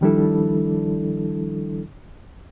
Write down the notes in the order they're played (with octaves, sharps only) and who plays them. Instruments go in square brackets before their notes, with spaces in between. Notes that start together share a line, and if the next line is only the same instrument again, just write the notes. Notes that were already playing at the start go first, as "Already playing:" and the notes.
[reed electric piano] D#3 F3 G3 D4 E4 A4